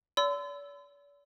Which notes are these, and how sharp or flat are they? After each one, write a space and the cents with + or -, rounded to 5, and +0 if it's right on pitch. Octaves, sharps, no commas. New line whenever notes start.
D5 -45 C6 -45 E6 +0